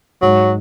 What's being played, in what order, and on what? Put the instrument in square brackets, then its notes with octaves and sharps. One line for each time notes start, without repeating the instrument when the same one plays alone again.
[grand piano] G#2 [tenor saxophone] F#3